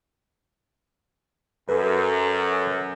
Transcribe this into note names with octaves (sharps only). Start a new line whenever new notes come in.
F#2 A4 B4